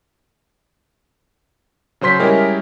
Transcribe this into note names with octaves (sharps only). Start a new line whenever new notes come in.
C#3 F#3 C5 C6 B6
G3 G#3 C#4 E4 G4 A#4